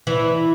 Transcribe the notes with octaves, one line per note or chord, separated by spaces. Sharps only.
E3